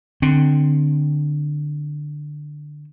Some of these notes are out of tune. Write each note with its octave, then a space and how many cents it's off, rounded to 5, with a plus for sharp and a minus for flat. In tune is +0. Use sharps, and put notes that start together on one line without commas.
D3 +15 C4 +0